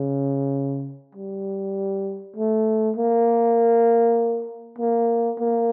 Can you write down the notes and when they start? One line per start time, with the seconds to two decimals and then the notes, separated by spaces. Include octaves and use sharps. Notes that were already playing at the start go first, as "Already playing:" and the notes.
Already playing: C#3
1.15 G3
2.37 A3
2.96 A#3
4.79 A#3
5.40 A#3